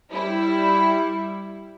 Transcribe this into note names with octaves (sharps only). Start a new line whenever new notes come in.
G3 E4